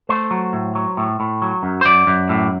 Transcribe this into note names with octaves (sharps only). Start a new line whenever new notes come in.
A3 C5
F#3
A2
F#3
A2
A2
F#3
F#2
C5
F#2 D5
F#2
A2